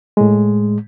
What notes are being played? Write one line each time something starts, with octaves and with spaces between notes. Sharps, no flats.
A2 G#3